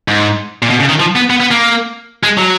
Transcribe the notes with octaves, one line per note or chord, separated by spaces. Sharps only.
G#2
A#2
B2
C#3
D#3
F3
B3
B3
B3
A#3
G#3
F#3